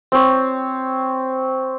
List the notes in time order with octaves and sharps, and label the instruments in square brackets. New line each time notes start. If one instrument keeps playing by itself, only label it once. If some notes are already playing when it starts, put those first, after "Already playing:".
[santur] C4 C#5